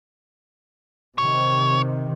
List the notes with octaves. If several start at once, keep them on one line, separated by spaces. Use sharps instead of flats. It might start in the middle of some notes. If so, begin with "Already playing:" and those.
C3 D#3 C#5